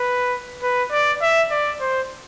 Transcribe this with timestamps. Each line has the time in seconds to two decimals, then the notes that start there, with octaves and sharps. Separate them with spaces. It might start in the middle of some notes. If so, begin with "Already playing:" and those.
Already playing: B4
0.63 B4
0.92 D5
1.22 E5
1.51 D5
1.80 C5